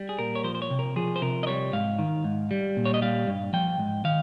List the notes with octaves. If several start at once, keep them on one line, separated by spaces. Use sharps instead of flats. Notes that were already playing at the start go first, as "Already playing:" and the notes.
Already playing: G3
G#4
A#2 A#4
C#5
F3 C5
C5
C#5
C3
A#4
F3 G#4
C5
C3 A#4
D#5
G3 C#5
G#2 F5
D#3
G#2
G3
A#2
C#5
D#5
G3 F5
G2
F3 G5
G#2
D#3 F5